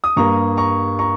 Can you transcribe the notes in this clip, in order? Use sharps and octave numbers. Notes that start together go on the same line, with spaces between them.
D#6
G2 G3 A#3 A#5 C#6
A#5 C#6
A#5 C#6